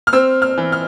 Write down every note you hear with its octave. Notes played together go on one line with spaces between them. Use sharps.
F6
C4 E6
F6
E3
F6